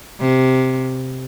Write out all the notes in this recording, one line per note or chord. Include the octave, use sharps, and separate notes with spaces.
C3